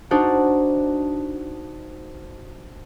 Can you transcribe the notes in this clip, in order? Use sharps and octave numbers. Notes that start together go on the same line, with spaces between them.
D4 D#4 F#4 C5 A5